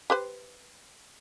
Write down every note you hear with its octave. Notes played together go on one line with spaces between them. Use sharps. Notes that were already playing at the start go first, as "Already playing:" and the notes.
G4 B4 C5